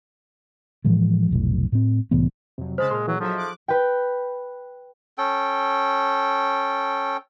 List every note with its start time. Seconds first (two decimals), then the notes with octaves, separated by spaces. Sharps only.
0.85 A2 E3 F3 G#3
1.31 F1 B1 A2
1.72 A2 C4
2.11 C2 A2 E3 B3
2.58 F2 C3 F#3
2.78 C#3 G#3 C5 A5 B5
2.91 A#2 G#4 C6 F6
3.08 E3 F#3
3.20 F3 F#3 D#4 A4 E5
3.37 D6 F#6
3.68 B4 G5
5.18 C#4 A4 G5